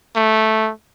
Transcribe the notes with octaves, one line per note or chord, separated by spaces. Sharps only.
A3